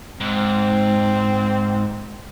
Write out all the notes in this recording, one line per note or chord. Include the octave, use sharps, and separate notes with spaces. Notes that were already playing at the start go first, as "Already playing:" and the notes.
G#2 C4